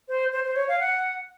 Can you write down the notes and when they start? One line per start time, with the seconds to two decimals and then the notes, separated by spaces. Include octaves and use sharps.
0.08 C5
0.32 C5
0.44 C5
0.56 C#5
0.68 F5
0.80 F#5